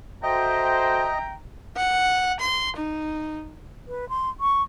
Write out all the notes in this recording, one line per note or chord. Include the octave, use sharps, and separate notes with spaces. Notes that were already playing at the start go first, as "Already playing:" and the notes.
F#4 A4 C5 D#5 E5 G5 A#5
F#5
C6
D#4
B4
C6
C#6